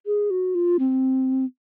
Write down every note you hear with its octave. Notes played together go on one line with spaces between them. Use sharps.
G#4
F#4
F4
C4